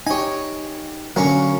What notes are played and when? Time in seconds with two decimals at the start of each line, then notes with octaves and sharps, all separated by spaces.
0.07 D#4 G4 C#5 G#5
1.16 D3 F#3 A#3 C#4 C#6